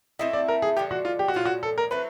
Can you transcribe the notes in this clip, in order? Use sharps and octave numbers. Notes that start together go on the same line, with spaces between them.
A3 C4 E4 D#5
D5
A#4
G#4
D3 F3 G#3 G4
F#4
F4
G4
F#4
A#2 F3 G#3 C#4 F4
F#4
A4
A#4
F#3 A3 C4 E4 B4